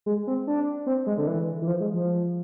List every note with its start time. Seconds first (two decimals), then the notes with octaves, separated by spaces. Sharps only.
0.06 G#3
0.27 C4
0.47 D4
0.86 C4
1.07 G#3
1.18 D3
1.27 E3
1.62 E3
1.67 F3
1.80 G#3
1.94 F3